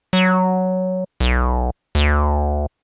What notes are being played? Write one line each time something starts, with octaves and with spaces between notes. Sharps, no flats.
F#3
B1
D2